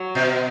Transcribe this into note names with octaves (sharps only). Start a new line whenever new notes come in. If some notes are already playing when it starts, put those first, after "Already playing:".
Already playing: F#3
B2